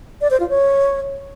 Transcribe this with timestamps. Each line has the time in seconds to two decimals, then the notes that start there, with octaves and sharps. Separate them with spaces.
0.21 D5
0.31 C5
0.40 F4
0.49 C#5